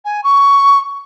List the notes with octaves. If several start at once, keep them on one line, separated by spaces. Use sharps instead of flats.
G#5
C#6